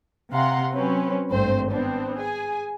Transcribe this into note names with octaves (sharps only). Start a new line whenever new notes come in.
C3 F5 F#5 A#5 C6
F#3 C4 C#4 B4
G#1 G2 A3 C4 C5
B3 C4 D4
G#4 G#5